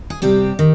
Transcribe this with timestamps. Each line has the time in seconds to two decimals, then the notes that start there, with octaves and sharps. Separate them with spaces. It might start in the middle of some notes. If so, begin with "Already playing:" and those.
0.10 G#4
0.22 C3 G3 C4 G4
0.59 D#3